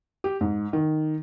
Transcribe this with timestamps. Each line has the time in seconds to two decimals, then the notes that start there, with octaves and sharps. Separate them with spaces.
0.24 G4
0.41 G#2
0.73 D#3